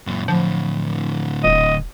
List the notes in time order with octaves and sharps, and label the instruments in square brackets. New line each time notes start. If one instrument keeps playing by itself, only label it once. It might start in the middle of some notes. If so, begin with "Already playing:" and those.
[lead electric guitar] F#2 A#2
[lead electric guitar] A2 D3 [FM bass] F3
[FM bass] D#1 [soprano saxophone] D#5